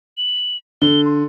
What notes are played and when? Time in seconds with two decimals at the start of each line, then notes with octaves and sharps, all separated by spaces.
0.18 F#7
0.82 D3 G7
1.05 C6